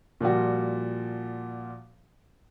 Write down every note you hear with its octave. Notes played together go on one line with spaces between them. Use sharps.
A#2 F3 G3 F#4